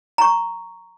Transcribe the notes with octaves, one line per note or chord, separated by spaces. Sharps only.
A#5 C#6